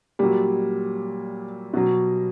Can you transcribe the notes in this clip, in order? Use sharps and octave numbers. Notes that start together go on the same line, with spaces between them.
A#2 F#3 G3
B2 F#3